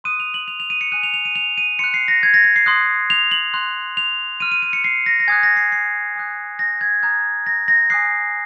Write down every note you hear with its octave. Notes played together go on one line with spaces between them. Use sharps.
C6 D#6 F#6 D#7
F7
F#7
F7
F7
D#7
C#7
G#5 D#6 F#6 D#7
F7
F7
D#7
F7
D#7
C6 F#6 C#7
C7
A#6
G#6
A#6
A#6
C7
C6 D#6 F#6
F7
F#7
C6 F#6
F7
C6 F6 D#7
D#7
D#7
C#7
C7
A#6
A#6
G#5 D#6 F#6 G#6
A#6
C7
C7
G#5 D#6 F#6
A#6
G#6
A#5 D#6 F#6 G#6
A#6
A#6
G#5 D#6 F#6 C7